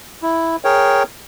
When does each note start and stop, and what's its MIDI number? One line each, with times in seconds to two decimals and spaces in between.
0.22 0.56 64
0.64 1.03 68
0.64 1.03 70
0.64 1.03 73
0.64 1.03 79